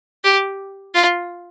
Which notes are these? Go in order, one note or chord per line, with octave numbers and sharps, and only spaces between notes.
G4
F4